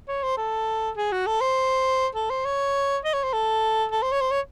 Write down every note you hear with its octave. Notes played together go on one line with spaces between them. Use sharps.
C#5
C5
A4
G#4
F#4
A4
C5
A4
C5
C#5
D#5
C#5
C5
A4
A4
C5
C#5
C5
C#5